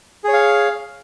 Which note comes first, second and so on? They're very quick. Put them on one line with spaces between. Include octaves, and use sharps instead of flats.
G#4 C#5 F5